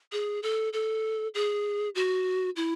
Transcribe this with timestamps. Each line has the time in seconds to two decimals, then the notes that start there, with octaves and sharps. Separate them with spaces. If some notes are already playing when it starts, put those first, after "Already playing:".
0.12 G#4
0.43 A4
0.73 A4
1.34 G#4
1.95 F#4
2.56 E4